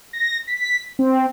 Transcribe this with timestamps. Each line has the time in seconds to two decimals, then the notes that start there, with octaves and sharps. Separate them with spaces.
0.13 A#6
0.47 B6
0.99 C4